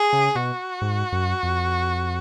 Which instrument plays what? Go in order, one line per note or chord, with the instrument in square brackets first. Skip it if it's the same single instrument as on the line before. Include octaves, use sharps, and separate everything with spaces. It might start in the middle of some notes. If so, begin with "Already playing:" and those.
Already playing: [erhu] G#4
[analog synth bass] C#3
[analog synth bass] B2 [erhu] F#4
[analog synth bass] G#2
F#2
F2